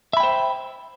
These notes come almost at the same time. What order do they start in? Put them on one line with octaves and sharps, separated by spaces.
E5 B5 G5 C5